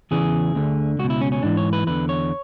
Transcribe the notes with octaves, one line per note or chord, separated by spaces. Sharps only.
E2 C#3 E3 G#4
D2 D3
C#2 B2 F#4
E4
C#4
C#4
G#2 E3 D4
C#5
B4
E2 D3 B4
C#5